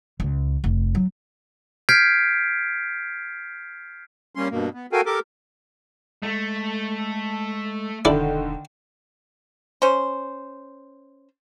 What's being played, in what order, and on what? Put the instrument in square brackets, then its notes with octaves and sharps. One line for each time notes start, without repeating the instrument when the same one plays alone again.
[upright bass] C#2
F1
F#3
[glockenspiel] F6 G6 G#6 B6 C7 D7
[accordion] G3 A#3 C#4 C6
G2 B2 A#3
B3
F#4 A4 A#4 F5 G5 G#5
G4 A4 A#4 D6
[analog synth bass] G#3 [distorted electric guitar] A3
[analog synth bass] E1 [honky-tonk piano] D3 D#3 [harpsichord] D4 E4 A4
[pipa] C#4 C5